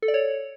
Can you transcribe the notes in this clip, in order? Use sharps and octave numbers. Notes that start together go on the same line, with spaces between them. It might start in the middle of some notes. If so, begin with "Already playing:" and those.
A4
D5
C#5